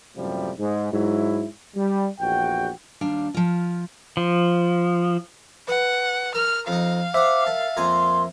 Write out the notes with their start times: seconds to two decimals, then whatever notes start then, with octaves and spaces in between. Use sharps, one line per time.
0.17 F#2 A2 C3 F3 G3
0.59 G#2
0.92 G#2 F#3 E4
1.76 G3
2.21 A#1 E2 F#4 G5
3.01 D#2 G3 D4 F5
3.34 F3 F4
4.17 F3
5.68 B4 F#5
6.35 A#4 F6
6.68 F2 D#4 F5
7.14 C5 E5 F#5 D6
7.47 A#4 A5
7.77 F2 A#3 G#5 C6